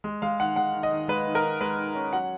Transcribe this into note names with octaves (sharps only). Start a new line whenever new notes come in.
G#3
G#3 F5
D#3 F#5
G#3 F#5
D#3
D#5
D#3
G#3 B4
D#3
A#4
D#3
G#3 B4
D#3
C#4
F#3 F#5